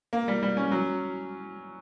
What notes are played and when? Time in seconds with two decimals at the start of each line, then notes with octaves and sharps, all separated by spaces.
0.13 A#3
0.28 G3
0.43 G3
0.57 C#4
0.71 F#3